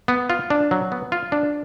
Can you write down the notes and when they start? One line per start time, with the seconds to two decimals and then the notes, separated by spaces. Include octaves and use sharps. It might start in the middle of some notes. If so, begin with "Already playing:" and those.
0.08 B3
0.30 F4
0.50 D4
0.71 F#3
0.92 B3
1.12 F4
1.32 D4